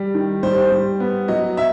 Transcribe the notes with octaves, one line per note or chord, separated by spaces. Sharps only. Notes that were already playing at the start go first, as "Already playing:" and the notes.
Already playing: G3
D#3
G3 C5
G3
B3
F#3 D#5
E5